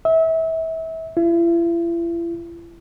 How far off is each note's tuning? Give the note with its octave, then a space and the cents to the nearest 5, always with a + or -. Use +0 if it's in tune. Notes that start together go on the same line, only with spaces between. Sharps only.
E5 -30
E4 +40